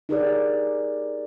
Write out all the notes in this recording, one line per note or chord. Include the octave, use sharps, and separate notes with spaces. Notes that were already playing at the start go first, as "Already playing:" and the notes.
D#4 G4 G#4 A#4 C#5 D5